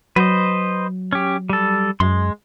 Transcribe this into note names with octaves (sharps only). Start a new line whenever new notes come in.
F#3 B4 C5 D#5
C#4 G4
G3 A4
F#2 G#3 C6